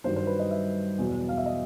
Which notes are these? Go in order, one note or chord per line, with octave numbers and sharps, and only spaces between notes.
G2 D#3 F#3 C5
C5
B4
D#5
E5
E2 B2 F#3
F5
E5
D#5